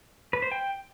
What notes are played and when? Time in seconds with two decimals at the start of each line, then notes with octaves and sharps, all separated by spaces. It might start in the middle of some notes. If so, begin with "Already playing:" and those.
0.33 B4
0.42 C5
0.52 G5